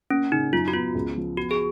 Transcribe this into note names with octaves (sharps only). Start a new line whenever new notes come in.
A#3 C#4
C#3 D#4
F#2 F4
F#4
B3 F4
C#2
F3
B3 F#4
G#4